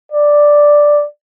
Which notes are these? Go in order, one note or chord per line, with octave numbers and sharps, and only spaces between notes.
D5